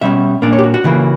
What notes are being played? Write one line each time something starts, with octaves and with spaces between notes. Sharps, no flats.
B2 G3 C#4 E5
A#2 A#3 D4 D5
C#5
G4
F#4
F#4
C#3 E3 A#3